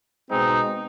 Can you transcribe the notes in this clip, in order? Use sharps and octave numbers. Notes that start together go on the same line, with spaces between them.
B2 G#3 C4 D#4